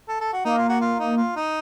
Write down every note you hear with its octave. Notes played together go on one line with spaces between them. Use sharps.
A4
A4
F#4
A#3 D#4
F4
F#4
F4
D#4
F4
D#4